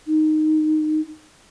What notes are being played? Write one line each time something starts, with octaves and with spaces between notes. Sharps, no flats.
D#4